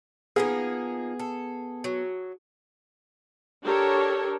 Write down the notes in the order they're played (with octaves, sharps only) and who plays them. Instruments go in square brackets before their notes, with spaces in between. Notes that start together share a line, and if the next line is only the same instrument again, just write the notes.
[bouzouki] F3 A#3 D#4 [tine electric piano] B3 [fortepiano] G#4
[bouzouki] A4
F#3
[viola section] D4 G4 A4 A#4 C#5